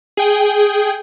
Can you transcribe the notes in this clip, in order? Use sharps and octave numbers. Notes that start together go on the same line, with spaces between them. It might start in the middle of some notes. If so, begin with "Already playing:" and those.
G#4 G5